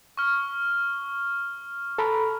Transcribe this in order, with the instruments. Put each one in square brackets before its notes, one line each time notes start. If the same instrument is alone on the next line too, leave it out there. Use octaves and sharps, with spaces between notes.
[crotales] C#6 F6
[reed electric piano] A4 A#5 B5